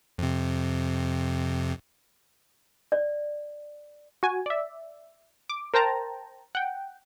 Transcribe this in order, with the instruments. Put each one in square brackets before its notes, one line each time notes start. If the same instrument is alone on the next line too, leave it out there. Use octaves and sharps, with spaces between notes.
[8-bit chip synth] F2 C3
[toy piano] D5
[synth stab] F#4 G#5
D5 E5
D6
A#4 C5 G5 A5 A#5
F#5 G5